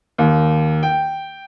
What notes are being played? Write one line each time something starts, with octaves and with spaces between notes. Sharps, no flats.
D#2
G5